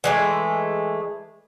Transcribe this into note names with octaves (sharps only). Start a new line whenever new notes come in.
E3 G#3 A3